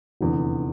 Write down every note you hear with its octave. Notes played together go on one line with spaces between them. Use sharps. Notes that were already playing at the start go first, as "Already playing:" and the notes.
F1 E2 D3